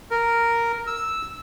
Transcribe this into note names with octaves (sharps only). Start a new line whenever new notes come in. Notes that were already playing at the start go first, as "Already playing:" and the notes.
A#4
E6